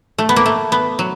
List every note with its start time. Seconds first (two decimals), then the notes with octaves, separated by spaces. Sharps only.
0.18 A3
0.29 B3
0.36 A#3
0.46 A3
0.72 B3
0.99 F#3